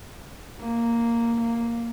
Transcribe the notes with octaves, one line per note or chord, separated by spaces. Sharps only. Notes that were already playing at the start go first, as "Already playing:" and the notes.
A#3
A#3